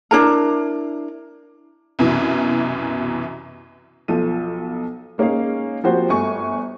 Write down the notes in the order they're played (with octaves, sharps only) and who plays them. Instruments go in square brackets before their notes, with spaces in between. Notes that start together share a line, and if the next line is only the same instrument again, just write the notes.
[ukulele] D4 E4 A#4 A#5
[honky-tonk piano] C2 F#2 B2 E3
[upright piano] B1 F3 A4 D#7
G#3 A#3 C#4 D#4 F5
F3 A#3 C4 F#4 G4 C5
G1 A3 G#5 C#6